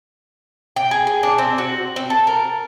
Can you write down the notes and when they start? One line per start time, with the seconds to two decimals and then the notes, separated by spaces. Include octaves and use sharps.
0.76 G5
0.91 G#4
1.07 G#4
1.23 D4
1.38 C4
1.58 F#4
1.96 C4
2.10 A4
2.27 A#4